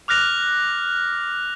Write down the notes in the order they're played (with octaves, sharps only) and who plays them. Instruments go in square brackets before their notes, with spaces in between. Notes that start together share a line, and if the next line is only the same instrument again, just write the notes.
[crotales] D6 F6 F#6 A#6 F7